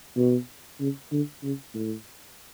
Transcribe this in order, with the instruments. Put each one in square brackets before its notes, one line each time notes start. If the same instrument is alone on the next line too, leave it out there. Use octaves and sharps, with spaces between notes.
[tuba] B2
C#3
D3
C#3
A2